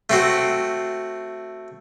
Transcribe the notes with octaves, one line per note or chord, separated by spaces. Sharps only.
A3 C4 F#4